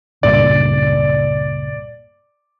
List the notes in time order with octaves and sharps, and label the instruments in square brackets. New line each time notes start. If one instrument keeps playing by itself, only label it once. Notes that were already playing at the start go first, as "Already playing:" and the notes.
[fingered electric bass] C#2 G2 A#2 [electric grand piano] D5